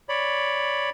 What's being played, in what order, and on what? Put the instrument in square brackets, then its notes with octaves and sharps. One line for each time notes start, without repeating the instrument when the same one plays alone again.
[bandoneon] C#5 D5 B5